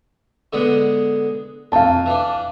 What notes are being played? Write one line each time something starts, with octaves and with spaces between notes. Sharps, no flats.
D3 G#3 B3
F2 F5 A5
E3 D4